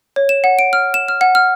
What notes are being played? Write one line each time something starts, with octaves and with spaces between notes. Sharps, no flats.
C#5
E7
F#5
D7
F6
E7
F6
F#5
F6